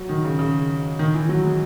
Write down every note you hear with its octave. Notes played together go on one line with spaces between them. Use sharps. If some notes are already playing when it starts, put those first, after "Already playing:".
Already playing: F#3
D#3
C#3
C#3
D#3
E3
F#3
G#3